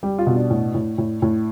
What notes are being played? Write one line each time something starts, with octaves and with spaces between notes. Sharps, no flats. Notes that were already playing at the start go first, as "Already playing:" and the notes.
G3 G4
F4
B2
D4
A2
A2
A2
A2